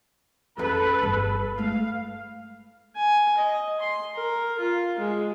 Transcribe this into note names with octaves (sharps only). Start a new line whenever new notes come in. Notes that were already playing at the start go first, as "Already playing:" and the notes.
F2 C#4 A4 B4
G1 F2
G#3 A3 F5
G#5
D#5
C6
A#4
F4
G#3